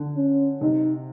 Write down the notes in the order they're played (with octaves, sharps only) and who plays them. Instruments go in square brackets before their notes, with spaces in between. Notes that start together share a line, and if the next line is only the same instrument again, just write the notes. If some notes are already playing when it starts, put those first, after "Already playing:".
Already playing: [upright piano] D3
[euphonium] C#4
[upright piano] C3 [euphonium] D#4